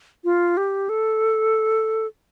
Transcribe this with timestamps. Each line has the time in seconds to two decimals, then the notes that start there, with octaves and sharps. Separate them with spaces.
0.24 F4
0.57 G4
0.89 A4